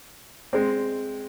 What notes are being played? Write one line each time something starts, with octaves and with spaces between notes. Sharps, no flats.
G#3 C4